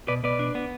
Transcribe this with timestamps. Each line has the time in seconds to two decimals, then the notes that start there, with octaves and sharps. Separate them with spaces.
0.08 B2 B4 D5
0.24 B2 B4 D5
0.39 D4
0.55 B3